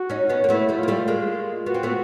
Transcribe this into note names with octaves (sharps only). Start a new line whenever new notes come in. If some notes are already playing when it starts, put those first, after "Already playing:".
Already playing: F#4
C#4 D#4
B3 C#4
A#3
A3 B3 E4
G3 A3
A#3 F4
G3 A3
G#3 A#3
B3 F#4
C4
A3 B3